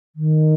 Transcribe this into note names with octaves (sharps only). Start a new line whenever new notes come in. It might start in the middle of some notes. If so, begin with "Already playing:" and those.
D#3